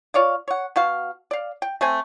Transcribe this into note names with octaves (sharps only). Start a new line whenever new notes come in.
F4 C#5 D5 F5
C#5 F#5
B2 F#4 F5
D5 F5
G5
A3 C4 G#5